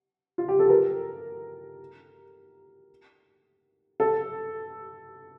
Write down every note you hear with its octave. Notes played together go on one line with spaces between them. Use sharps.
F4
G4
A4
A#4
A4